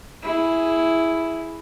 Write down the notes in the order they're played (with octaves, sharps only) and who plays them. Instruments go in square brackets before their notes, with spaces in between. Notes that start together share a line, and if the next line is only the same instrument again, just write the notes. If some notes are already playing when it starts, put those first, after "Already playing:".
[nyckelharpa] E4 G#4